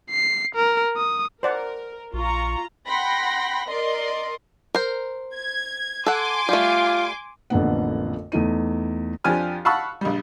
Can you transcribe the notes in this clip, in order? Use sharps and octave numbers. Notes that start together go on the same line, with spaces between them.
C7
A#4
D#6
A#4 C5 D5 F#5
A#1 F4 A#5 C#6
F#5 G5 B5 C6 A#6
A#4 D5 D#5 C6
A#4 C5
G#6
A4 F#5 G#5 C6 D6
G3 A3 F4
A1 F2 D3 A#3 B3 F#5
E2 A3 D#4 D#7
F2 F3 D4 G4 G#5 F6
F5 F#5 A5 B5 C#6 E6
A#1 G3